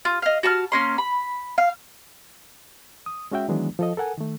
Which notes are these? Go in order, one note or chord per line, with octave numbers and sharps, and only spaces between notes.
F4
D#5 F5
F#4 A5 C#6 F6
A#3 C#4 C6
B5
F5
D#6
G#3 C#4 F#4 E5 G5
D#3 E3 F#3 G#3 B3 D4
F3 A4 D#5
A4 A#4 F#5 G#5
D#3 A3